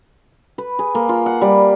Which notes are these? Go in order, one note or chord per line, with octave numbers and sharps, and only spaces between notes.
B4
G#4
A#3
F4
F#5
G3